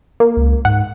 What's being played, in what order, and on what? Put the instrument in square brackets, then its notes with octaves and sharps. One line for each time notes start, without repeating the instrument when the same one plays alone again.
[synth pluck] A#3
[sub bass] C#2
[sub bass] G#2 [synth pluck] F#5